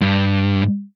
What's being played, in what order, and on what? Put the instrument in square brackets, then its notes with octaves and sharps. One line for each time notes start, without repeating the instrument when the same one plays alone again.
[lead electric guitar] G2